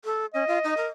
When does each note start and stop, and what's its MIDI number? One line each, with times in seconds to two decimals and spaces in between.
0.04 0.26 69
0.34 0.44 61
0.34 0.92 75
0.48 0.58 65
0.64 0.74 63
0.77 0.87 70